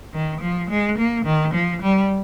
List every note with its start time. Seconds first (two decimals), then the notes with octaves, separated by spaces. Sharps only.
0.13 D#3
0.41 F3
0.69 G#3
0.98 A#3
1.25 D#3
1.54 F3
1.82 G3